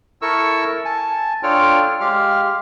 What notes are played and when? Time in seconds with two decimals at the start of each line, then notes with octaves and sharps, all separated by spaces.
0.22 E4 A4 A#4 C#6 E6
0.85 G#5 A5
1.43 D4 F4 A4 C#5 G5 F6
2.00 G#3 G4 F5 F6